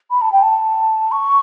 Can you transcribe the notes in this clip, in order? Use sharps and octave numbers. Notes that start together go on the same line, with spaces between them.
B5
A5
G5
A5
C#6